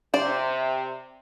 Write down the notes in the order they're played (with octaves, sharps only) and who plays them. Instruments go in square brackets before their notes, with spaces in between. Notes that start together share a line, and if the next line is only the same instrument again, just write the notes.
[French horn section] C3 [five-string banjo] C5 D5